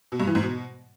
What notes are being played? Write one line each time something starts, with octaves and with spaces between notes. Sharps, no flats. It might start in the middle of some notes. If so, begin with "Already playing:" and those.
B2
G2
E3
G#2
B2